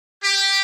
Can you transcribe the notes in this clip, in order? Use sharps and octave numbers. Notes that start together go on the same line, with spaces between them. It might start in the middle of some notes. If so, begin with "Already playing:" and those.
G4